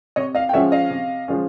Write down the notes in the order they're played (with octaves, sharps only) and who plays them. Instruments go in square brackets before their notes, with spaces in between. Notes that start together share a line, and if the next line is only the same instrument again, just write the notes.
[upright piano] C3 C#5 D#5
D#5 F5
G5
F3 G#3 C#4 E5 F#5
D#5 F5
C3
F3 G#3 C#4